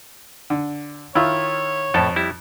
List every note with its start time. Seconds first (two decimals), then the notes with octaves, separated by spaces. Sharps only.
0.50 D3
1.15 D#3 E4 F4 C#5
1.94 F2 A2 E4 A4 A5
2.16 G3 E4 G4